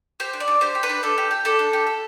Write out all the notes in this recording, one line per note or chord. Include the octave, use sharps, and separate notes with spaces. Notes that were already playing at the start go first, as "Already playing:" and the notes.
G4 C5
D4
D5
D4
G4 C5
G4
B4
D4
D4 A4
G4
G4
D4 A4
D4
G4
A4